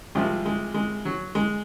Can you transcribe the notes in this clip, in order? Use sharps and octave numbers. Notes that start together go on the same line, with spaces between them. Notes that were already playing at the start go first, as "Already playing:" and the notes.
C2 C3 F3 G#3
G#3
G#3
F#3
G#3